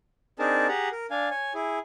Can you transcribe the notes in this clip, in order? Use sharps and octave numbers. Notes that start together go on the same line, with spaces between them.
C4 D4 D#4 G#4 A#4 A5
G4 G#4 F#5 A#5
A#4
D4 F5 G#5
C#5 G#5
E4 G#4